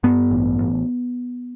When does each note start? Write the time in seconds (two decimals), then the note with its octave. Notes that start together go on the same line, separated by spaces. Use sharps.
0.03 G2 B3
0.31 A1
0.59 A1